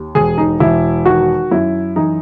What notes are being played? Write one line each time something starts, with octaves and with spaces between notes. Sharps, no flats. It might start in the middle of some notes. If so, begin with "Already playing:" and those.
Already playing: D#2
E1 G#4
D#4
E1 E4
D#3 F#4
F#2 E4
E3 D#4